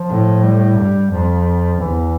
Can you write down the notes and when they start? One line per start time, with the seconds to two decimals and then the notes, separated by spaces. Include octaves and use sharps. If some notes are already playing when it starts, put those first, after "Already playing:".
Already playing: F3
0.09 A2
0.44 G3
0.78 G2
1.11 F2 F3
1.80 E2 E3